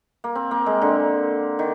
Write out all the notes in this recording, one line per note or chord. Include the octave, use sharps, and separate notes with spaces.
A#3
C4
A#3
G#3
D3
D#3